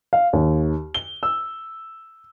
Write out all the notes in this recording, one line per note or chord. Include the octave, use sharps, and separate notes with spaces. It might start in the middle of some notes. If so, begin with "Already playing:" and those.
F5
D#2
G7
E6